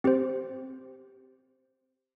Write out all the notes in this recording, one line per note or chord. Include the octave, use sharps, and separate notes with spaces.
C4 G4 C5